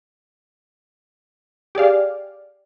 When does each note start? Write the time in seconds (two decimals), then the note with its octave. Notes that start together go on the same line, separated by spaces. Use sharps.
1.75 G4 G#4 D5 F5